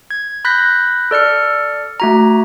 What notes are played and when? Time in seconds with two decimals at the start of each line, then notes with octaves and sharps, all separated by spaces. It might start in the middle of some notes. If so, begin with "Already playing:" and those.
0.11 G#6
0.45 B5 F#6 G6 A#6 B6
1.11 A4 D5 F6 C#7
2.00 A3 F#4 A#5